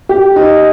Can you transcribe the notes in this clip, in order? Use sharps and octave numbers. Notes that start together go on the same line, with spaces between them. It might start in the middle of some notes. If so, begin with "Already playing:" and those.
G4
D#4